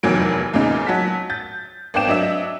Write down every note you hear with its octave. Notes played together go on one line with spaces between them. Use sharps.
F1 E2 D#3 E3 F#3 D7
E2 A#2 C#3 D#4
F#3 F#4 A5 B6
G6 A6
G#1 B3 D4 D5 G5 E7
F#3 D4 D#5 E5